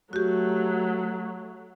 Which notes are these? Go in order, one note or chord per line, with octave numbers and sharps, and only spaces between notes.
F#3 A3 F#4 G4